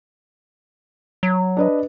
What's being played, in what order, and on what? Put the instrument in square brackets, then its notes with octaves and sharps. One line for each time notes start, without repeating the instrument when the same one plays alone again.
[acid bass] F#3
[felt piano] D4 B4 D#5